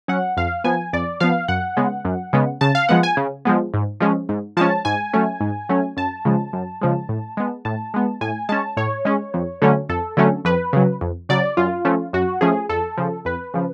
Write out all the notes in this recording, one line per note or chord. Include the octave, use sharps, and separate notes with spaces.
F#3 C#4 F#5
F2 F5
F3 B3 G#5
F2 D5
F3 B3 F5
F#2 F#5
C#3 G#3 B3
F#2
C#3 G#3 B3
C#3 A5
F5
F3 G#3 B3 F#5
G#5
C#3
F3 G#3 B3
G#2
F3 G#3 C#4
G#2
F3 G#3 C#4 A5
G#2 G#5
F#3 A3 C#4
G#2
F#3 A3 C#4
F#2 A5
C#3 F3 G#3
F#2
C#3 F3 G#3
A2
G#3 B3
A2 A5
G#3 B3
A2 G#5
G#3 C#4 A5
A2 C#5
G#3 C#4
F2
D3 F#3 A3 C#4
F2 A4
D3 F#3 A3 C#4
F2 B4
C#3 F#3
F2
C#3 F#3 D5
F#2 F4
F3 A3 C#4
F#2 F#4
F3 A3 C#4 G#4
F2 A4
C#3 F3
F2 B4
C#3 F3